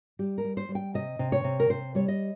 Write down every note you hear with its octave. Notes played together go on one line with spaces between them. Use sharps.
G3 G4
A#4
G3
C5
G3
G5
C3 D#5
C3
C#5
C3
A#4
C3 C5
G3 C#5
D#5